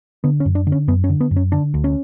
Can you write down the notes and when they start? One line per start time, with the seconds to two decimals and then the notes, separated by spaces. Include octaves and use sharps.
0.24 D3 B3
0.40 C#4
0.46 F#2
0.55 D4
0.67 D3
0.72 C#4
0.88 F#2 B3
1.04 C#4
1.10 D3
1.21 B3
1.31 F#2
1.36 C#4
1.52 D3 D4
1.74 D2
1.84 C#4